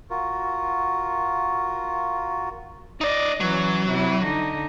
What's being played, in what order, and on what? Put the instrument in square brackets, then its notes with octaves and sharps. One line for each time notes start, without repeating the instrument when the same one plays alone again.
[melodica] F4 F#4 A#4
[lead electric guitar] D#4 D5 [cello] D#5
[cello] E3 C#4 [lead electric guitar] F#3
[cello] C3 E4
D3 D#4